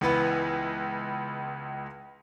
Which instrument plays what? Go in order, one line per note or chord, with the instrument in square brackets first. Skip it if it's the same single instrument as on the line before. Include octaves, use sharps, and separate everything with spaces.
[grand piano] C#2 E3 B3 B4